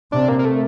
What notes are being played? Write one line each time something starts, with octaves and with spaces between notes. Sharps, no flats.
C3 D4
A#3
A#3
A3